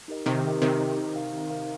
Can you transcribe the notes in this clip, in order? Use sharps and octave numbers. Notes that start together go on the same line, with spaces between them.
D#4 G4 A#4 D#5
C3 D#3 C4
D#4 G4 A#4 D#5
C3 D#3 C4
D#4 G4 A#4 D#5
D#4
A#4 F5
D#4
A#4 F5